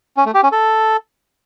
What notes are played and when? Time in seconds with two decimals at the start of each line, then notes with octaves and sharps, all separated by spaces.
0.17 C#4
0.26 A3
0.34 G4
0.43 C#4
0.52 A4